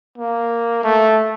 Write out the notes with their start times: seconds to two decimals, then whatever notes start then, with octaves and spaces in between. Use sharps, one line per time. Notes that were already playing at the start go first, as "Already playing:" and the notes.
0.18 A#3
0.84 A3